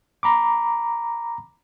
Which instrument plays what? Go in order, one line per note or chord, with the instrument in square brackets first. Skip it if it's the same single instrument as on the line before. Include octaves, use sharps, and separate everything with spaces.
[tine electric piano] A#5 B5 D6